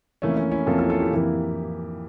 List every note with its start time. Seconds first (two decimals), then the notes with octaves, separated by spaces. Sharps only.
0.22 F2 E3 A3 A#3 C#4
0.37 A3 C#4
0.52 C#4 E4
0.66 F2 E3 A#3 F4 A4
0.79 F4 A4
0.90 F4 A4
1.00 E4 G4
1.11 F2 E3 A#3